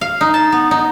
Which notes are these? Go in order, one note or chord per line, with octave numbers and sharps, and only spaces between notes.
F5
D#4
A5
B3
D#4